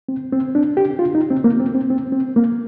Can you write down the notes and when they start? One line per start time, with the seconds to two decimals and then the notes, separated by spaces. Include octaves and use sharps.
0.09 C4
0.32 C4
0.55 D4
0.77 G4
0.99 F4
1.15 D#4
1.30 C4
1.44 A#3
1.60 C4
1.75 C4
1.90 C4
2.12 C4
2.36 A#3